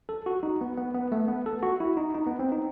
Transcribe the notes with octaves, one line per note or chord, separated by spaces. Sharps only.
A4
F#4
D#4
B3
B3
B3
A3
B3
A4
F#4
E4
D#4
D#4
B3
C4
D#4